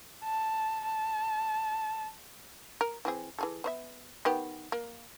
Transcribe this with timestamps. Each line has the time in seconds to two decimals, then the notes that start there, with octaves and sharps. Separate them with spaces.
0.24 A5
0.84 A5
2.81 A#4
3.05 E3 C4 G#4
3.39 E3 G#4 A4
3.64 B3 C5 E5
4.25 D#3 B3 G4
4.72 A#3